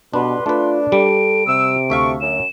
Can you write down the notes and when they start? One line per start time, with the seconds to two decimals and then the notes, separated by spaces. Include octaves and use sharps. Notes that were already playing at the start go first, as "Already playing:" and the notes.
0.14 B2 D3 G3 D4 B4 C6
0.46 A3 D4 F4 B4
0.92 G3 A4 D7
1.47 C3 E6
1.90 D2 A4 E5 F5 A5 C#6
2.21 F#2 E7